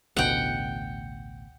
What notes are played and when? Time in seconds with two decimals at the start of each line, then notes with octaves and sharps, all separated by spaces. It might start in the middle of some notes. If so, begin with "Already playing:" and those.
0.17 A1 D2 B2 F#5 G5